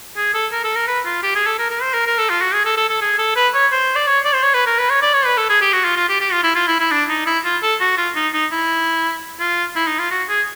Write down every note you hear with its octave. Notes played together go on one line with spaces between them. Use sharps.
G#4
A4
A#4
A4
A#4
B4
F4
G4
G#4
A4
A#4
A#4
C5
A#4
A#4
A4
F4
F#4
G#4
A4
A4
A4
G#4
A4
B4
C#5
C5
D5
C#5
D5
C5
C#5
B4
A#4
B4
C#5
D5
C#5
B4
A4
G#4
G4
F#4
F4
F4
G4
G4
F4
E4
F4
E4
E4
D4
D#4
E4
F4
A4
F#4
F4
D#4
D#4
E4
F4
E4
D#4
F4
F#4
G#4